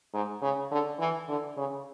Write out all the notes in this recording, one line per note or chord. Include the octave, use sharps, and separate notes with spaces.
G#2
C#3
D3
E3
D3
C#3